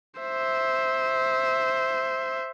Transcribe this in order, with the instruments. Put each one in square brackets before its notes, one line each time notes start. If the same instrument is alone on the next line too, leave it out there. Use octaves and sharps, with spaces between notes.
[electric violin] C5 E5